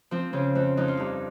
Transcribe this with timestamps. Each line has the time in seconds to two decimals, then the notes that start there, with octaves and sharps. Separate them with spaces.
0.11 F3 C4
0.33 C#3 C4
0.55 F2 C4
0.77 F2 D#4
0.88 F4
0.97 G2 D#4